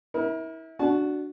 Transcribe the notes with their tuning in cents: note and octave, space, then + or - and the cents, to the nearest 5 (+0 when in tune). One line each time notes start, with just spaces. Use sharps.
E4 -30 A#4 +25
D4 +0 F#4 +0 A5 -30